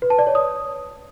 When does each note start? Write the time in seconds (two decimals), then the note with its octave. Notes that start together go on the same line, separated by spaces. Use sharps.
0.02 B4
0.10 A5
0.19 D5
0.27 C#5
0.35 D#6